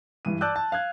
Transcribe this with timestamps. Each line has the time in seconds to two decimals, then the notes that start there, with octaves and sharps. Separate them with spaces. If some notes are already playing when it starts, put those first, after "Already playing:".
0.25 G2 E3 D#7
0.41 D5 A5 D6 E6 F#6 G6
0.56 A5
0.72 F5 F#6 G#6